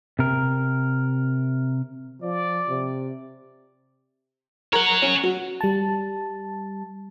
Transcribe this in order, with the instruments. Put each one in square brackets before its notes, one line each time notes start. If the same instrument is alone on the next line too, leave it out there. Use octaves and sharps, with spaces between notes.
[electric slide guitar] C3 A#4
[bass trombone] F3 [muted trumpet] D5
[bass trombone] C3
[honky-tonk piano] A#4 [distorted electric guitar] C#5 F#5
[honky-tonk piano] C#4
F#3
[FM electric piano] G3 A5